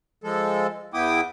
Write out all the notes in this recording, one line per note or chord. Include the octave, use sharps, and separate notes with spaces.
F3 G#3 A4
E2 B3 E4 G5 D6 D#6